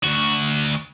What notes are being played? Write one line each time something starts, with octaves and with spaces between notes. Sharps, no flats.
D2 F#4